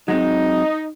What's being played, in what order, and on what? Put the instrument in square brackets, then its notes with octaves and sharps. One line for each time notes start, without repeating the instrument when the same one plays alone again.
[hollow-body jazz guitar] F#3 G#3 C4 [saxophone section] D#4